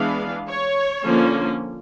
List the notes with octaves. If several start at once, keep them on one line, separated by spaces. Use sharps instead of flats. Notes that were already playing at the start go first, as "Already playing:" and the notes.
Already playing: E3 G#3 B3 D4 F5
C#5
D3 F3 A#3 C#4